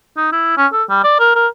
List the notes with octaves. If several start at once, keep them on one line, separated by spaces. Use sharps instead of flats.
D#4
E4
C#4
A4
G3
D5
A#4
A#4